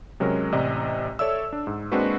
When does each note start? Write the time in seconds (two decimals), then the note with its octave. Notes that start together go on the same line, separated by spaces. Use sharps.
0.20 C3 F#3 G#3 C#4 A#4
0.52 A1 C3 D5 D#5 A#5
1.19 A4 C#5 D5 E5 E6
1.53 D4
1.67 G#2
1.92 G#3 A#3 C4 D4 F#4 B4